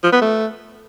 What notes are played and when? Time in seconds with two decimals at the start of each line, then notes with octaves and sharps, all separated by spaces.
0.03 F3
0.12 B3
0.22 A3